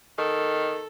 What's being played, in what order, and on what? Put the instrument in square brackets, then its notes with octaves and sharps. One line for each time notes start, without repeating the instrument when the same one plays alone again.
[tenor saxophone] D#3 [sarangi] A4